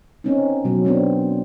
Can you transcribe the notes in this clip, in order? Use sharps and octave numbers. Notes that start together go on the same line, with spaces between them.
C4 C#4 D#4
B2 F#3
B3 C4 D4